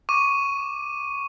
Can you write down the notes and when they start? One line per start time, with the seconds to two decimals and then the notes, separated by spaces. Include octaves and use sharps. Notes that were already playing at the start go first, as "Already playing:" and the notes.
0.09 C#6 D6 D#7